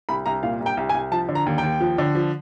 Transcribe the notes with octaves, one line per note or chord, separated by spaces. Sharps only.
C2 B5
C2 A#5
A#2 F5
C2
G5
C2
G#5
C2
F3 A5
D3
A#5
D#2
G5
D#2
F3
D3
F3